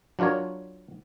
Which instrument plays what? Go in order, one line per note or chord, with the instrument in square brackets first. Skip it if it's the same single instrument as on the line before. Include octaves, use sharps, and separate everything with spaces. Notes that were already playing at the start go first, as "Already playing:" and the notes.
[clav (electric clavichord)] F#3 D4 F4 A#4 C#5